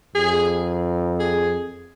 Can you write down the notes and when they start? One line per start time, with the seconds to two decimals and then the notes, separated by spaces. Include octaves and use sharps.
0.15 F2 G#4
1.20 G#4